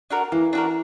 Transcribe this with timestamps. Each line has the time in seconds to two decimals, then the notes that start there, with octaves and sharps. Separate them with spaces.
0.10 D4 F#4 A#4
0.32 E3 A#3
0.53 D4 F#4 A#4